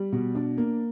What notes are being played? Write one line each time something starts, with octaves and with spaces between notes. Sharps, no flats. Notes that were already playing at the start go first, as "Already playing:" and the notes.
Already playing: G3
B2
D4
A#3